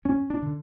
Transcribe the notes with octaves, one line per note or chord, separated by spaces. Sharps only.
F#2 C#4
D4
D3